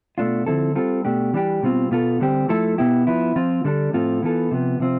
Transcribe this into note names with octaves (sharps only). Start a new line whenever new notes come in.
B2 A3 D4 F4
D3 F3 C4 E4 A4
G3 C4 F4 A4
B2 A3 D4 G4
E3 G3 D4 G4
B2 G3 C4 F4
B2 B3 F4 A4
D3 G3 C4 G4
F3 A3 E4 A4
B2 B3 E4 G4
F3 B3 E4
F3 C4 F4
D3 G3 D4 A4
A2 F3 C4 F4 A4
E3 B3 F4 A4
C3 F3 B3
C3 F3 C4 F4